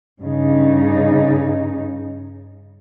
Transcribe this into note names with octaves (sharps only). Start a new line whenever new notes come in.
G2 C#3 D#4